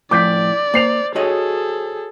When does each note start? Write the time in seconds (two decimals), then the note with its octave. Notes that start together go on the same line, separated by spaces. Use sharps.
0.11 A2 F3 D5 D6 G6 B6
0.74 A#3 C5 C7 F7
1.16 F#4 G#4 A4 C#5 D#5